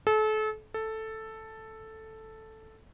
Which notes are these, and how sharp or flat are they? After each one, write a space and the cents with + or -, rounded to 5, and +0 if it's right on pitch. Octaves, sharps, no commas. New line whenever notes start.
A4 -35
A4 +0